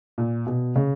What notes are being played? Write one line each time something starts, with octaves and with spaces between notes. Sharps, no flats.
A#2
B2
C#3